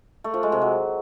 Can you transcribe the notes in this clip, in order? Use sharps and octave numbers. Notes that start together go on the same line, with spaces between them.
A3
F3
G#3
C3
F#3